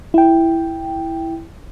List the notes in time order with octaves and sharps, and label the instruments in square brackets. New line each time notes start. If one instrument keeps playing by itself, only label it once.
[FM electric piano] E4 G5